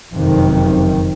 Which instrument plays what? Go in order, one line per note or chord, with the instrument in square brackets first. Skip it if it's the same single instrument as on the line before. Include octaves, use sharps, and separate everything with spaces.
[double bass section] F#1 F2 C3 D#3